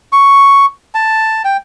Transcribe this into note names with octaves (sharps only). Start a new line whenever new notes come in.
C#6
A5
G5